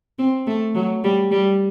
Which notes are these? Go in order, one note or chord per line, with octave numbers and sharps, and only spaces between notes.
C4
A3
F#3
G3
G3